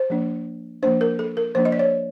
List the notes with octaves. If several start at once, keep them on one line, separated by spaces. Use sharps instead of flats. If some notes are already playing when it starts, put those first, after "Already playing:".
Already playing: C5
F3 A#3 D4
F3 A#3 D4 C5
A#4
A4
A#4
F3 A#3 D4 C5
D#5
D5
C#5